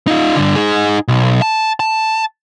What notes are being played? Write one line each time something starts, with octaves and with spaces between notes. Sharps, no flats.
D#4 F4
G2 D3
D#4 G#4
B1
A5
A5